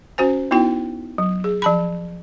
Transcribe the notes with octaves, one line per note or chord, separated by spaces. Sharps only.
C#4 F#4 C5 G#5
B3 D#4 E4 F#4 G5
F#3
G#4
F3 A5 B5